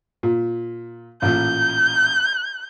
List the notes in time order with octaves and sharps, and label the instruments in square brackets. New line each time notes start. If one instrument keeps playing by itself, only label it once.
[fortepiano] A#2
[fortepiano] A1 A#2 [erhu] G6